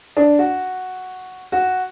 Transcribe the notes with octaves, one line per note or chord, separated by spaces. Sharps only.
D4
F#4
F#4